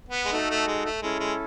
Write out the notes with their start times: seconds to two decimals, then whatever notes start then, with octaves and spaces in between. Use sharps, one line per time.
0.09 B3
0.25 G#3
0.32 A3 D#4 F#4 A4
0.50 A3
0.67 G#3
0.85 A3
1.02 G#3 C#4 E4 A4
1.20 G#3